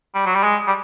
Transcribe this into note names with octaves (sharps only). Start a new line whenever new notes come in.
G3
F#3
G3
G#3
G3